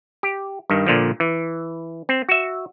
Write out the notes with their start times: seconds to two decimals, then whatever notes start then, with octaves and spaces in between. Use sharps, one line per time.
0.23 G4
0.70 G2 D#3
0.87 A#2 D3 F3
1.20 E3
2.09 C4
2.29 F#4 E5